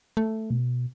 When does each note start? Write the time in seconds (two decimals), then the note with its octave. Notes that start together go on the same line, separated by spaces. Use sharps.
0.17 A3
0.50 B2